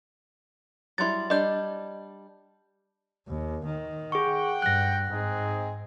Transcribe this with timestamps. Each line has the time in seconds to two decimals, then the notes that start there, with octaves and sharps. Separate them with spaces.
0.98 F#3 G3 E4 C6 A6
1.30 G3 D4 D#5 G6
3.27 D#2
3.66 D#3
4.12 G#4 F#5 G5 C#6
4.62 G2 F#6 A#6
5.11 G#2 C4 D#4 G#4